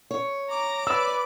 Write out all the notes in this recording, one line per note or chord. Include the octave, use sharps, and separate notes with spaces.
C#5
A#5 D6
B4 D5 E6